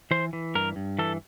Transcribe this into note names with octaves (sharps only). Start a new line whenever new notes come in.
E3 C5
E3
G2 A#4
G2
E3 A4